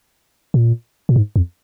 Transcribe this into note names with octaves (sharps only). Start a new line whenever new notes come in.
A#2
A#2
G#2
F2